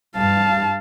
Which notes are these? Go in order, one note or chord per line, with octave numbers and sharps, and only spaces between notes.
G2 F5 A5